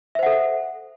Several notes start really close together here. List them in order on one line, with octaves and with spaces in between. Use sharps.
E5 C5 F#5 A4